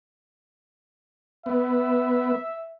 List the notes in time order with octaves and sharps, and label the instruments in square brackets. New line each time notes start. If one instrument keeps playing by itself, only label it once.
[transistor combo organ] B3 [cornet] E5